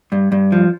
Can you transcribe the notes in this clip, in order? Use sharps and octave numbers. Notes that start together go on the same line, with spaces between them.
G2
G2
F3